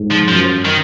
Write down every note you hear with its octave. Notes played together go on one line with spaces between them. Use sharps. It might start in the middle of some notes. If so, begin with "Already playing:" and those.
Already playing: G#2
F3
F#2 F3
D#3